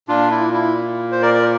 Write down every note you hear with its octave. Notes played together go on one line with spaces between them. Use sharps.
A#2 D4 F4
E4
E4
C5
A#4 D5
D5